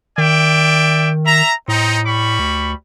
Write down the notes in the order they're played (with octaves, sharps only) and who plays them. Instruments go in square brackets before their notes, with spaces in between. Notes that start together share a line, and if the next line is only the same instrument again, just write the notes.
[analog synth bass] D#3 [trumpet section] D5 E5 G5
[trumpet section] E5 A#5
[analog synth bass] A2 [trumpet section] C4 D#4
[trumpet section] G3 B5 C#6
[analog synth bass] D2